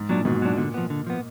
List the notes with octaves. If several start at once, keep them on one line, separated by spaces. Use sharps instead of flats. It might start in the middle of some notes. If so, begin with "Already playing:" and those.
Already playing: G#2
A#2 F#3 D4
G#2 B2 D#3
A#2 F#3 D4
A#2 D3
F3 B3
D3
F3 B3